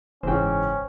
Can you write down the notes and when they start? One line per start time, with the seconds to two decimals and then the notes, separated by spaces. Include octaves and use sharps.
0.23 F#1 G#2 C#3 E3 C#4 C5 G5